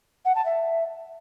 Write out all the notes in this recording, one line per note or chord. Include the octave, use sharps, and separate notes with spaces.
F#5
A5
E5